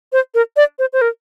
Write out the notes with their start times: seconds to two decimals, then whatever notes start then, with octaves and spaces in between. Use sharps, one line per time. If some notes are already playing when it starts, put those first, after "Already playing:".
0.13 C5
0.34 A#4
0.57 D5
0.79 C5
0.93 C5
1.01 A#4